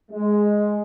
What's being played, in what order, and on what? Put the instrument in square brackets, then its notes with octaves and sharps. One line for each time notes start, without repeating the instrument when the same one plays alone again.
[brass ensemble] G#3